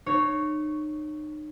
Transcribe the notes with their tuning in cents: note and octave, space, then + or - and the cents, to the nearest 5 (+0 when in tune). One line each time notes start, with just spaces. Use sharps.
D#4 -35 C#5 +0